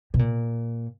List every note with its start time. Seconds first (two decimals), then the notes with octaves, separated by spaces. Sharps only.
0.14 B2
0.19 A#2